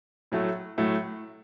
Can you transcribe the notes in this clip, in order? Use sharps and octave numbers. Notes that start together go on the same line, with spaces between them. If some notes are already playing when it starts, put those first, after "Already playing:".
A2 F#3 A3
A2 F#3 A3